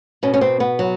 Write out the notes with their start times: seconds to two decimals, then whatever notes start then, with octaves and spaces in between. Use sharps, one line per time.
0.23 B2 C#4
0.34 C#4
0.41 C4
0.60 B3
0.79 F#3